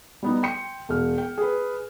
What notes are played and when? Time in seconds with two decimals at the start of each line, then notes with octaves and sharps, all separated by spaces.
0.23 G3 B3 D#4
0.43 G5 C6 C#7
0.89 E1 F6
1.18 G5
1.38 G#4 B4